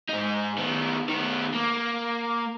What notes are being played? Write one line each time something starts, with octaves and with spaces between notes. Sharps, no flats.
G#2 D#4
D#3 B3
D#3 B3
A#3